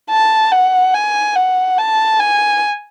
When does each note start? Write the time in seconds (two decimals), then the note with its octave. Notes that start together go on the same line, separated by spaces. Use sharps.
0.10 A5
0.52 F#5
0.94 G#5
1.35 F#5
1.78 A5
2.19 G#5